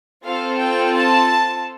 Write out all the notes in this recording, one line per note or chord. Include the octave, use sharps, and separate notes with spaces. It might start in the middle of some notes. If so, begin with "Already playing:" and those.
C4 F4 A4 F5
G5
A5